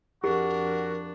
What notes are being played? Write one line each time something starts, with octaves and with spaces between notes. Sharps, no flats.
F2 D4 F#4 G4 A#4